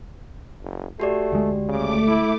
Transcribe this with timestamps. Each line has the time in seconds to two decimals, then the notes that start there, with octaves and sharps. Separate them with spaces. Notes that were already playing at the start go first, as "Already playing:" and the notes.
0.62 F#1
1.00 A3 F#4 G4 D5
1.32 D2 G#3
1.69 C#3 A3 D6
2.08 E4